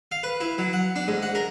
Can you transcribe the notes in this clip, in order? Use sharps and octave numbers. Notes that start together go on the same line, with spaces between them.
F5
B4
E4
F#3
F#5
D4
G#2
F#5
A#4